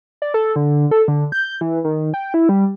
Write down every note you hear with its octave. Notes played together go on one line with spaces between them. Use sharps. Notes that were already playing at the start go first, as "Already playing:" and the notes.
D5
A4
D3
A4
D3
G6
E3
D#3
G5
E4
G3